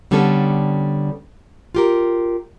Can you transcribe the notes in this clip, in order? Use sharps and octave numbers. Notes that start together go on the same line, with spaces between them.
D3 G3 B3 C#4 A4
F4 G4 A#4